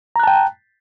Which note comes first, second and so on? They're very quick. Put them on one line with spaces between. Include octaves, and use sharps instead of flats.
A#5 F#6 A5 G5